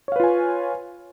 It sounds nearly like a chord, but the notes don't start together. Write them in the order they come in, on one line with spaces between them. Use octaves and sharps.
C#5 F5 B4 F4 G#5